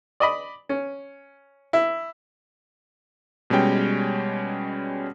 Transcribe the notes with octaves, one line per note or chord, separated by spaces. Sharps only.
D5 D#5 B5
C#4
E4
B2 G3 G#3 C#4 G5